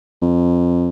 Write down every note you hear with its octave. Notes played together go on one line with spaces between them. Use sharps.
F2